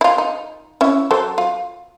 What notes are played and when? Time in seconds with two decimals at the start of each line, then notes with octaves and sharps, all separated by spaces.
0.01 E4 F4
0.18 D#4
0.81 C#4 E4 E5
1.11 F#3 A4 C5
1.38 F4